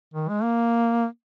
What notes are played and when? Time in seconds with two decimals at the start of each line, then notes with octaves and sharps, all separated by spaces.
0.14 D#3
0.28 G#3
0.43 A#3